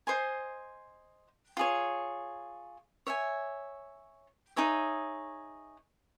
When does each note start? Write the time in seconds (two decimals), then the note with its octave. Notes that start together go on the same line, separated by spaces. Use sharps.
0.07 C5 D#5 G#5 C6
1.57 F4 G#4 C#5
3.07 C#5 E5 G#5
4.56 D#4 G#4 C#5 E5